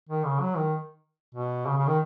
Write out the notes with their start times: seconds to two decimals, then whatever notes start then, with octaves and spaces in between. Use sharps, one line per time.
0.09 D#3
0.25 C#3
0.41 F#3
0.57 D#3
1.35 B2
1.67 C#3
1.77 C#3
1.87 D#3